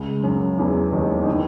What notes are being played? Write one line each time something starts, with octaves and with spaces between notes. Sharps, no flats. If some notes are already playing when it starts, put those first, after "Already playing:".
Already playing: C#2 C#3
F#2 F#3
E2 E3
D#2 D#3
D#3
E3